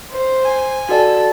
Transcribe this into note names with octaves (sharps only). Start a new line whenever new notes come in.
C5
G#5
F#4 A4 D5